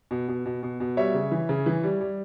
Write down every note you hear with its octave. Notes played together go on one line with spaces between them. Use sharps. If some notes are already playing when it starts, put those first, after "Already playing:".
B2
B2
B2
B2
B2
G3 C#5 E5
C#3
E3
C#3
E3
G3
G3